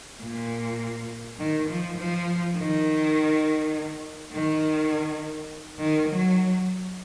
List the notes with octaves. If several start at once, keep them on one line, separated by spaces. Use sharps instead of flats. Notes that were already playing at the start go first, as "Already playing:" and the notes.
A#2
D#3
F3
F3
D#3
D#3
D#3
F#3